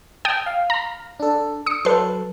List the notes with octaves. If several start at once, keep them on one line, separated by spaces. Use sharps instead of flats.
G5 A5 D#6
F5
A#5
D4 A4
D#6 C#7
F#3 A4 B4 C6